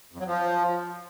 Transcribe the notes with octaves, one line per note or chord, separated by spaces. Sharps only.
F2
F#3
F3